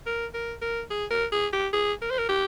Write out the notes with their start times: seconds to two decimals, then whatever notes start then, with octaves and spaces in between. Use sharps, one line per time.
0.06 A#4
0.34 A#4
0.62 A#4
0.90 G#4
1.10 A#4
1.32 G#4
1.53 G4
1.73 G#4
2.01 A#4
2.10 C5
2.19 A#4
2.29 G4